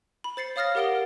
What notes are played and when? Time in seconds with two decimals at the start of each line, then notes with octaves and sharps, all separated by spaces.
0.24 B5
0.37 C5 A6 C7 C#7
0.56 C#5 F5 D#6 F6 A6 A#6
0.75 G4 A#4 F#5 D#6 D7 G7